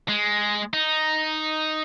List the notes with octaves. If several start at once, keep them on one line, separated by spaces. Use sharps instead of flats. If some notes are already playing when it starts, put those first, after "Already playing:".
G#3
D#4